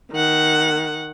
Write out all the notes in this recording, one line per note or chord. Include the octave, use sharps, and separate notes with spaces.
D#3 F#5